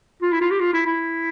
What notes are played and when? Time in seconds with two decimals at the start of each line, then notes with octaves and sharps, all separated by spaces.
0.22 F4
0.32 E4
0.41 F4
0.51 G4
0.60 F4
0.73 E4
0.86 E4